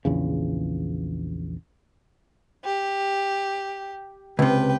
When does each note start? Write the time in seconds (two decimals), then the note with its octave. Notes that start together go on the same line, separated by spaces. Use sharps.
0.05 A#1 E2 C#3
2.65 G4
4.39 C#2 C3 B4 G5